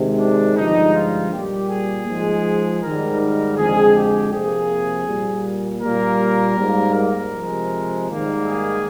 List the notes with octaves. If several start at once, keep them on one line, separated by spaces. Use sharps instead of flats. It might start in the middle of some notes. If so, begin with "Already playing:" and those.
Already playing: C3 D#3 G#3
D4
G2 D3 F3 G#3 D#4
F4
A#2 G3 A#3 G4
G#4
G#2 F3 G#3
G#2 D#3 G3 A#4
A#4
F2 D3 G#3 G#4
G4
F2 C3 F3 A#3 G#4
A#2 G3 A#3
A#2 G3 A#3 A#4
G#2 G3 A#3
A#4
C3 F3 G#3
G#2 D#3 G3 A#3
G#4